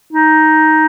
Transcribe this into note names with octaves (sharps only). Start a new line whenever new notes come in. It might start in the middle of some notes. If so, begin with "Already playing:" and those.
D#4